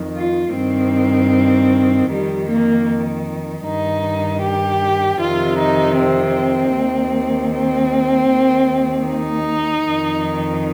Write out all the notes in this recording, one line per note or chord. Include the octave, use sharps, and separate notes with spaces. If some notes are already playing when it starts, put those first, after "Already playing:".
Already playing: F2 D#3
F4
G2 D#3 C4
F2 D#3 G3
A#3
G2 D#3 D#4
G4
F2 C3 D#3 F4
D#4
C4
D#2 D#3
C4
D#2 D#3
D#4
F2 D#3